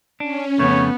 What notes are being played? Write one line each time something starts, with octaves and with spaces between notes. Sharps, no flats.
C#4 D4
F2 C#3 A3 B3 C#5